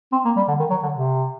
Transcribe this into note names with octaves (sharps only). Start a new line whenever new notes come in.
C4
A#3
G3
D3
D#3
F#3
D3
C3